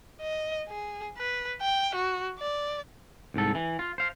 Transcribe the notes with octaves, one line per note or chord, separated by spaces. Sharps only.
D#5
G#4
B4
G5
F#4
D5
C2 G#2 A4
E3
F4
C5 F5